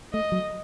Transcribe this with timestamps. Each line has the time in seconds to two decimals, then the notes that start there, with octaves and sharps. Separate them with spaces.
0.13 A3 D#5
0.32 F#3